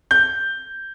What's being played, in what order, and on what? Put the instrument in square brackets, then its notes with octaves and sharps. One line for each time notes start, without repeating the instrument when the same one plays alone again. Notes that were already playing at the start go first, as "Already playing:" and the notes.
[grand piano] G6